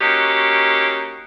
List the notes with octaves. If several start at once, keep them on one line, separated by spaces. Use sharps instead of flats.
A#3 C#4 D#4 F#4 G4